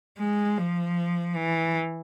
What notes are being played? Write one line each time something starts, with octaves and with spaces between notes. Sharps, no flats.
G#3
F3
E3